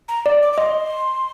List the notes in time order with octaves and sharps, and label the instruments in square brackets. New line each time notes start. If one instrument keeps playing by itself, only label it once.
[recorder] A#5
[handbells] D5
[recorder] D6
D6
[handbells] D#5 [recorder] C6